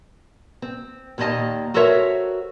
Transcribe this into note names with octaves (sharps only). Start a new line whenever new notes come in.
C4
D#2 A#2 D#3 D4 D#5 A5
F#4 A4 A#4 C5 C#5 E5